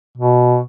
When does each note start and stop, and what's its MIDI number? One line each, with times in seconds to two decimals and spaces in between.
0.18 0.60 47